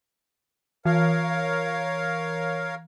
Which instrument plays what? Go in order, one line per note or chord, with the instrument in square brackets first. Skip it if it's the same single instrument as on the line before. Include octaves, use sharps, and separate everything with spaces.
[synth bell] E3 [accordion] A#4 C#5 F5